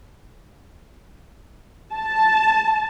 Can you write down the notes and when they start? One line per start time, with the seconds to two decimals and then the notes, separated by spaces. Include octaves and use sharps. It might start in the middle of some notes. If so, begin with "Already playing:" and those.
1.94 A5